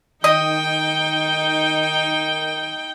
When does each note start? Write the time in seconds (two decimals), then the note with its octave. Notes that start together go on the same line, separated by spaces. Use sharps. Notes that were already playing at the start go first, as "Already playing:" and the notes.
0.24 D#3 D#4 D#5 G5